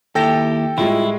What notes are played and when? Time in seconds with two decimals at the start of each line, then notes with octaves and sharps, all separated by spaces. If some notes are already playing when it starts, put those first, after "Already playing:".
0.15 D#2 E4 G4 A4 G5 A#6
0.78 A2 G3 G#3 E4 F4